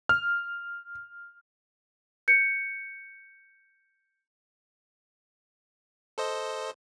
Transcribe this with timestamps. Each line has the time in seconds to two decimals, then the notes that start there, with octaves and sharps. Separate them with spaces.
0.09 F6
2.28 G6 C#7
6.18 A4 C5 D#5